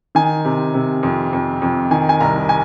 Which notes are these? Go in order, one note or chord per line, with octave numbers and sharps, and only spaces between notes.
D#3 G#5
C3
C3
F2
F2
F2
D#3 G#5
G#5
C2 A#5
G#5